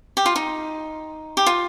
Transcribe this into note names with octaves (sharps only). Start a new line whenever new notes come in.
G4
F4
D#4
G4
F4